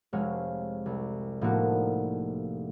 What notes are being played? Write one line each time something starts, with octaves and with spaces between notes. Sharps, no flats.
F1 G#3 C#5 F5
C2
A2 F3 A#3 D4 D#4 F#4